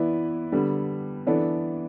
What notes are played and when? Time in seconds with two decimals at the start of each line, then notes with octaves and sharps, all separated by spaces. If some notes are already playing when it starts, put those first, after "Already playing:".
Already playing: E3 B3 E4 B4 D5
0.52 D3 G3 B3
1.27 E3 B3 D4 A4 D5